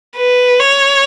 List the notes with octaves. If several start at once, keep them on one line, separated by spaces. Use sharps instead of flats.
B4
C#5